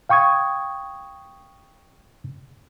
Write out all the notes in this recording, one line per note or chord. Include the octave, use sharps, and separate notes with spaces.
F5 G5 C#6 D#6 G#6